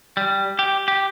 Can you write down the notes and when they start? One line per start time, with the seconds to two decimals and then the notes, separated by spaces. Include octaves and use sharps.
0.17 G3
0.59 G4
0.88 G4